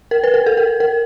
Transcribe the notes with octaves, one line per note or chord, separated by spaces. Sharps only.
A#4
B4
A#4
A4
A#4
A#4